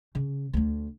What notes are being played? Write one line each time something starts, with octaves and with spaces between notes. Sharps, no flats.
C#3
D2 A3